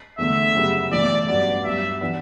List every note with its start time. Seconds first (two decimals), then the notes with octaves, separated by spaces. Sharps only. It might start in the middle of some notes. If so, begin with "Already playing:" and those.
0.18 E2 D3 A3 E5
0.55 F#2 C#3 G3 B3
0.91 B1 A2 E3 D5
1.28 A1 G2 F#3 B3 F#4 D5
1.64 G2 F#3 B3 E5
2.01 E3 B3 D4